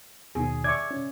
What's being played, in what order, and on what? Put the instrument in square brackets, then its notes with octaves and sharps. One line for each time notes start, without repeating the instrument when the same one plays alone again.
[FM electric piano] D#2 B2 D#3 [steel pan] G#4
[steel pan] D5 E5 C#6 [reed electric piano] G#6
[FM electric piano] C#4